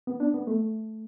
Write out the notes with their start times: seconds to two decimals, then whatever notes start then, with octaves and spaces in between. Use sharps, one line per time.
0.07 B3
0.20 D4
0.34 B3
0.47 A3